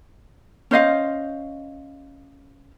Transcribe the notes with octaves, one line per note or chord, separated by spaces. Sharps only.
C#4 C5 D#5 F5